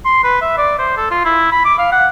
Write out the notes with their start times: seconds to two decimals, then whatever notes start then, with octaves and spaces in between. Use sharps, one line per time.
0.05 C6
0.24 B4
0.42 E5
0.58 D5
0.79 C5
0.97 A4
1.11 F4
1.25 E4
1.52 B5
1.65 D6
1.79 F5
1.92 F#5